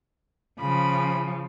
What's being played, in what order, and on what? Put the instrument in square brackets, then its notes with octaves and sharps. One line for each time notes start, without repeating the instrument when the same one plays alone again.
[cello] C#3 F3 [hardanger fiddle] B5